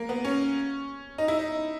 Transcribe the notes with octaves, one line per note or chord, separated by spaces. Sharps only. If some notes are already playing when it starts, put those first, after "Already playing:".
Already playing: A#3
B3
C#4
D#4
E4
D#4